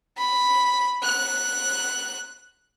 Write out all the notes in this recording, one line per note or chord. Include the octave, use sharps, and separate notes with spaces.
B5
F#6